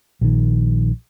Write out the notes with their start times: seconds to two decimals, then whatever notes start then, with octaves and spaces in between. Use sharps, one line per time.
0.21 A#1 D#3